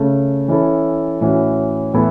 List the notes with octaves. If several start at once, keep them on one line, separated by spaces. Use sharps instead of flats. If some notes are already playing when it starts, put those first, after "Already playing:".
Already playing: C#3 A3 C#4
E3 C#4 E4 A4
A2 E3 C#4 F#4
A2 E3 B3 E4 A4